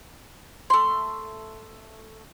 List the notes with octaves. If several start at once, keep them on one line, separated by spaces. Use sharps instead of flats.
A3 C6